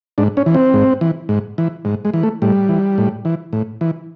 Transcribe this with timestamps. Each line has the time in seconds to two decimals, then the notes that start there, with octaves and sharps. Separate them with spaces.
0.18 G#2 D4
0.37 C#4
0.46 E3
0.54 C4
0.74 G#2
1.01 E3
1.29 G#2
1.58 E3
1.85 G#2
2.05 G#3
2.14 E3
2.23 A3
2.42 A2 G3
2.69 E3
2.98 A2
3.25 E3
3.53 A2
3.81 E3